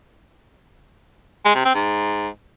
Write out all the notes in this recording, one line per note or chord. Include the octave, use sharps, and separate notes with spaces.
G#3
C3
C4
G#2